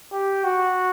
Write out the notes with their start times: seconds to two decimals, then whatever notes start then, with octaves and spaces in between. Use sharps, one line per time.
0.12 G4
0.44 F#4